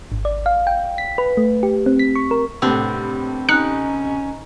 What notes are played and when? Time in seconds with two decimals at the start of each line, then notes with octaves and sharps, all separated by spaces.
0.12 G#1
0.25 D5
0.46 F5
0.67 G5
0.98 B6
1.18 B4
1.37 A3
1.63 G4
1.86 C4
1.99 B6
2.16 C#6
2.31 A#4
2.62 A2 C3 B3 C4 D4
3.49 C#4 D#4 F#6 C#7